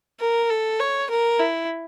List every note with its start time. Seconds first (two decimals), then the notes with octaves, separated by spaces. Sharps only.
0.20 A#4
0.50 A4
0.80 C#5
1.10 A#4
1.40 E4